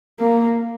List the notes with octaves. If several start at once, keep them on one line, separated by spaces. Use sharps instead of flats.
A#3